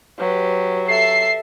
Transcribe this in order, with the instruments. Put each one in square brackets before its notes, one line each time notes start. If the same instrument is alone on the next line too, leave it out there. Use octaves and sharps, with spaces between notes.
[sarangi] F#3 [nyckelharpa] G4 B4
[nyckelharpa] A4 [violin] E5 [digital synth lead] C7